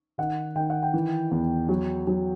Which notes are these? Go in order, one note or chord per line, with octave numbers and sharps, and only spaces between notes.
D#3 F#5
D#3 G5
F#5
G5
E3
E2
F#3
F#3